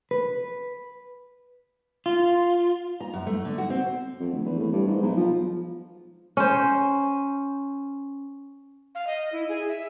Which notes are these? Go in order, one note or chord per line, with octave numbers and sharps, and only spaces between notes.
B4
F4
A#5
F#2
A3
D3
F#4
C4
F2
D1
E2
A2
G2
G#2
B1
F3
C#4 C5
F5
D#5
E4
G#4
E5